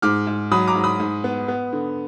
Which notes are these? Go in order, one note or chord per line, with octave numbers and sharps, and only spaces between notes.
G#2 D6 F6
G#2
F#3 B5 D#6
A#5 D6
G#2
B5 D#6
G#2
B3
B3
D3